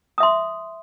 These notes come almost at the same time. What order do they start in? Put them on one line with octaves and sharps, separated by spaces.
D#6 E5 C6